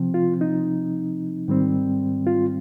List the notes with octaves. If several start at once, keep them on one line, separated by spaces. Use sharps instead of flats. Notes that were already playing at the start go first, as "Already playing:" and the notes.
Already playing: C3 F3 C4
F4
D#4
G#2 D#3 G3 C4
F4